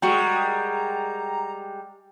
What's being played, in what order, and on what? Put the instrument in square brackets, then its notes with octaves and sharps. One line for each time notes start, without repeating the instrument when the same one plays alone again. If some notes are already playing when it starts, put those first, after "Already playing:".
[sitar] G3 G#3 [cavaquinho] F#4 A#4 [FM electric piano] G5 [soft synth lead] A#5